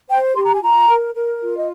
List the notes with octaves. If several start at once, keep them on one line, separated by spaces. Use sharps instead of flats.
C5 G5
G4 C6
A#5
G#5
F4 A#5
A#4
A#4
F4
D#5